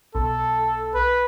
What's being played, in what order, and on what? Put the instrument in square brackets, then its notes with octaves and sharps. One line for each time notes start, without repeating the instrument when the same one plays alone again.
[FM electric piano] B1 [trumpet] A4
[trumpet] B4